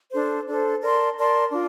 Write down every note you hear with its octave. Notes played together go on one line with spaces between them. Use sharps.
D4 A4 C5
D4 A4 C5
A#4 D5 A5 C6
A#4 D5 A5 C6
D4 F4